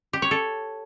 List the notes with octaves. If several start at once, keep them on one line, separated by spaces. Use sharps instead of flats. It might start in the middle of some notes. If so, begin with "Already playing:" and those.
G4
C#5
A4